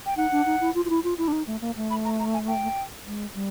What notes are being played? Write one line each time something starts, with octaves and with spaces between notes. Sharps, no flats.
G5
D#4 F#5
D4
D#4
E4
F4
F4
E4
F4
E4
D4
D#4
A3
A#3
A3
B5
A#5
A#5
G#5
G5
G#3
G3